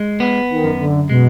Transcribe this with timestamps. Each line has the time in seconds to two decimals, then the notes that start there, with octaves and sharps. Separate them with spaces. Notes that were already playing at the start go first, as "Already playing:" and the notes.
Already playing: G#3
0.20 B3
0.50 D#3
0.64 F#2
0.79 D3
1.09 B2 G#3